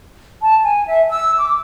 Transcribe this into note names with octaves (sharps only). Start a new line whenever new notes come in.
A5
G#5
E5
E6
D6